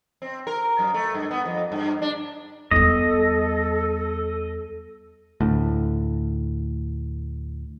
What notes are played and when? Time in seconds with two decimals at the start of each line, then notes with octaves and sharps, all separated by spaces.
0.22 C4
0.47 A#4
0.79 F#2
0.94 A3
1.14 G2
1.31 B3
1.46 F2
1.72 G2
2.02 D4
2.71 E2 G3 A4 D#5
5.41 D2 A2